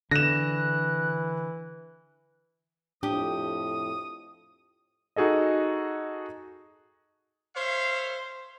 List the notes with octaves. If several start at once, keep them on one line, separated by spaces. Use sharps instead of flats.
D3 E3 F#6 A#6 E7
F2 A2 F3 D4 G4 D#6
D#4 F#4 G#4 A4 D#5
C5 C#5 E5 F5